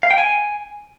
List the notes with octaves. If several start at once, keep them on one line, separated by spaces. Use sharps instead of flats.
F5
G5
G#5